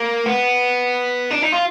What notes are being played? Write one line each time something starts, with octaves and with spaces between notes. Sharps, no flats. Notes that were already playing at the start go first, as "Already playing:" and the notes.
Already playing: A#3
B3
D4
D#4
F4